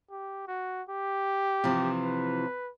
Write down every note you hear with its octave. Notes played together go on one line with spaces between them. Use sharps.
G4
F#4
G4
C3 E3 F3
B4